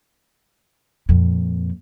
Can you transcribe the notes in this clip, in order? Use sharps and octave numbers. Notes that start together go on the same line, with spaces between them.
F2 A#2